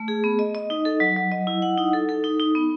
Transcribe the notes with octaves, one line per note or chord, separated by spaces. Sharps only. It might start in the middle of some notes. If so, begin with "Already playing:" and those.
Already playing: A3
G#4
B3
D#5
D#5
D#4
A4
F#3
F#3
D#5
E4
F#5
D#4
A4
A4
D#4
D#4
B3